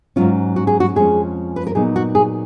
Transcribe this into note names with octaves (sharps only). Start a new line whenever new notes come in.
G#2 F#3 C#4 F4
F#4
G#4
F#4
F2 F3 G#3 C#4 G#4
B4
A#4
A#2 F#3 B3 D#4 G#4
F#4
G#4